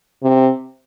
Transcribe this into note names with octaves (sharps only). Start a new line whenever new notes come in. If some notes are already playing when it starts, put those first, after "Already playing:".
C3